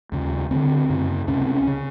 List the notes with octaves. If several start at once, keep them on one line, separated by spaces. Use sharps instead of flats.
D#2 C#3
D2 D3 C4
F#2 C#3
C#2 C3 C#4
C4
C#4
C#3